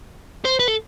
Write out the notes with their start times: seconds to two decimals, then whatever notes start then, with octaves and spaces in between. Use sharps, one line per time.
0.45 C5
0.59 B4
0.68 A4